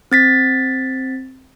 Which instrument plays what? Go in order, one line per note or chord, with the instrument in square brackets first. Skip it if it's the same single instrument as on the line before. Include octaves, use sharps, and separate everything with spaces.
[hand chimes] C4 A6 B6